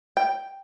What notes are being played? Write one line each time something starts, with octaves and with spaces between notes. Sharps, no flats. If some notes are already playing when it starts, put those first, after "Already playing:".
G5